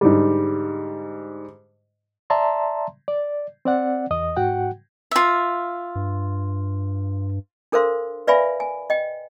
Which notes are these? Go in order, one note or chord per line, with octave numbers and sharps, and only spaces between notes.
G#2 D3 G3
D5 E5 A5 A#5 C6
D5
C4 D5 F#5
E2 D#5 D#6
G#2 F#4 F#5 G5
F4 E5
G2
D4 A4 A#4 C5 F5 C6
B4 D5 E5 F5 G#5 B5
G#5
D#5 G5